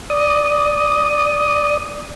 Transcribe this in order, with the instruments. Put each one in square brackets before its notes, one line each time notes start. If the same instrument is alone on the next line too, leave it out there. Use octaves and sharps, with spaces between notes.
[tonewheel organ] D5 D#6